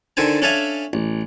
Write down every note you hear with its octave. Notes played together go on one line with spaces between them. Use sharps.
D3 D#3 A4 C5 G#5 A5
C#4 D4 A4 E5 F5 G#5
A1